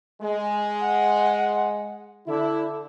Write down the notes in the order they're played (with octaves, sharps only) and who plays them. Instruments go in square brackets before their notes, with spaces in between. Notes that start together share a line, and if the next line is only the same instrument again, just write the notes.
[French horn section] G#3
[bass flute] F#5
[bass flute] D3 [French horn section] E4